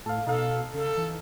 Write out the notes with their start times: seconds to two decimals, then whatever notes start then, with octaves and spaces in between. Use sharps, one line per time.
0.06 A2 A4 F5
0.27 B2 D#4 A4 F5
0.74 C#3 A4
0.97 E3